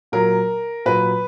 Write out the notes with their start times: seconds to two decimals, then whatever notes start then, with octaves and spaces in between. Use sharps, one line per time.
0.12 A#2 F#3 A#4
0.86 A#2 F#3 B4